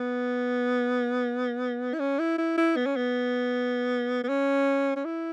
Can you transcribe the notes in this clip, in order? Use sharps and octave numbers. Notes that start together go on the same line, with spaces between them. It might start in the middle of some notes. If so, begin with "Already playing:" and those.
Already playing: B3
E4
C#4
E4
E4
E4
B3
C#4
B3
B3
C#4
C#4
E4